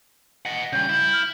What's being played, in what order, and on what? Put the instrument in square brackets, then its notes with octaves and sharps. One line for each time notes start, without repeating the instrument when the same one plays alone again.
[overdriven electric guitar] D#5 F#5
[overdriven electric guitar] C#3 G3 [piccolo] G6
[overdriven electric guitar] E4
[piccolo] F6